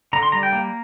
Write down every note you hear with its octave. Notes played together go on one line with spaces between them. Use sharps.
D3 A#5
C6
G3 A#5
G5
A#3